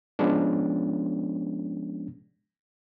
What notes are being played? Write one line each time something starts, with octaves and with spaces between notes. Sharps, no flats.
F3 G#3 B3 C#4 D4